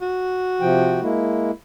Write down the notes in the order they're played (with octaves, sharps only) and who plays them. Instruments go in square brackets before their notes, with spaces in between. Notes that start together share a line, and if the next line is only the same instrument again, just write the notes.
[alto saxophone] F#4
[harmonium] C3 F3 G5
G#3 A#3 E4